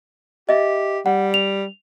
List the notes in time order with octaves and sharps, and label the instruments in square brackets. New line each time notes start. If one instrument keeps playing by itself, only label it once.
[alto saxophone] G4 [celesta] D#5 E5
[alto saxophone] G3 [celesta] F#5
[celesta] F7